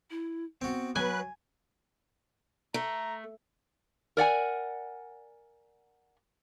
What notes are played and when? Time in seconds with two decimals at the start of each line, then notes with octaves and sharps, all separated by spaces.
0.11 E4
0.62 B3 C4 F#4
0.96 F#3 B4 G#5 F#6
2.74 A3 A#5
4.17 A#4 D5 F#5 G#5